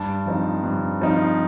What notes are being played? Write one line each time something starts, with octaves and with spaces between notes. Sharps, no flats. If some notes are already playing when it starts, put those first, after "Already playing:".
Already playing: G2 A5
F3 C4 D#4
G2
F3 C4 D#4